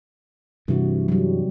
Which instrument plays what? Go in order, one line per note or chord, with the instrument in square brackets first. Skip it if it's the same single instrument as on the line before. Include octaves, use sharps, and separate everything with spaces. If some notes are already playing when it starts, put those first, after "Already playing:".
[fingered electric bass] G2 E3 [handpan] C3 F#4
[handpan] F#3 G3